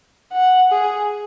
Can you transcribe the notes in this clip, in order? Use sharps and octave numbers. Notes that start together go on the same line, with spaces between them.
F#5
G#4